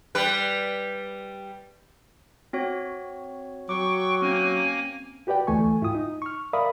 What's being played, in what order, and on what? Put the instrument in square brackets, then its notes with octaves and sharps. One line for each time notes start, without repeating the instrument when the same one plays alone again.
[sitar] G3 B4
[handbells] C4 F#4 C#5
[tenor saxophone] F#3 [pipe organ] G5 C#6 [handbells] D6
[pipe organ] A#3 G#5 [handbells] C4 C#4
[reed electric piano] F#4 G4 B4 D5 G5
D2 E3 A3 G#5 C#6
G#2 E4 F4 G5 D#6
D#4
C#6 F6
A#4 D5 E5 F5 B5 D#6